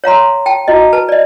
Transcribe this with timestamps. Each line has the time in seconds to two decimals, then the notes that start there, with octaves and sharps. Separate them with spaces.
0.04 C#5 F5 A#5 C6
0.46 G5 A5
0.68 E4 F#4 D#5
0.93 B4 A5
1.09 D5 D#5